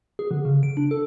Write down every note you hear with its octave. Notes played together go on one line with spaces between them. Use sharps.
G#4
D3
C#3
D7
D4
A4